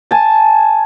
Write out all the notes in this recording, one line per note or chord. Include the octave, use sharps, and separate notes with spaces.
G#5 A5